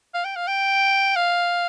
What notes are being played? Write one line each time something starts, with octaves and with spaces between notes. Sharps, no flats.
F5
G5
F5
G5
F5